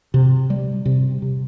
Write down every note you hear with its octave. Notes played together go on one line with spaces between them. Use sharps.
C3
G3
C3
C3